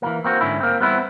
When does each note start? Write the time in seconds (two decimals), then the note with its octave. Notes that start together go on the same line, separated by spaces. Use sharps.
0.02 E3 F#3 A#3
0.25 A#3 C4 F#4
0.41 G#2 D3 C#4 E4
0.61 A#3 C4
0.80 G3 B3 C4 E4